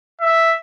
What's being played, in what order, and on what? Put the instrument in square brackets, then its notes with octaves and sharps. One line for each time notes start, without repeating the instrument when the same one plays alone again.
[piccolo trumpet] E5